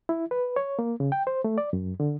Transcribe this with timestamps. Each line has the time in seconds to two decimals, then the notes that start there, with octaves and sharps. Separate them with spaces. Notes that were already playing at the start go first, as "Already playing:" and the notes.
0.09 E4
0.31 B4
0.56 C#5
0.79 A#3
1.00 C#3
1.12 G5
1.27 C5
1.44 A3
1.58 D5
1.73 F#2
2.00 D3